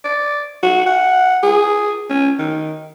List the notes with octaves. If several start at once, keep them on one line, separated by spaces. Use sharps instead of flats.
D5
F#4
F#5
G#4
C#4
D#3